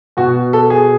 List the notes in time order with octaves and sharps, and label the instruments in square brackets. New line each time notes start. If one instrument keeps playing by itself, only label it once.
[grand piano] B2 F#4
A4
G#4